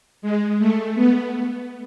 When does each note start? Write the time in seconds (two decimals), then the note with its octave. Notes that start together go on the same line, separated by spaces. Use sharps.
0.22 G#3
0.59 A3
0.95 B3